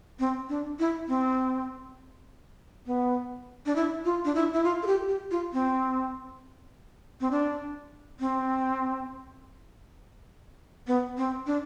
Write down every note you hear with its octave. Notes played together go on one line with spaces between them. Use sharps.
C4
D4
E4
C4
B3
D4
E4
F4
D4
E4
E4
F4
A4
G4
G4
F4
C4
C4
D4
C4
B3
C4
D4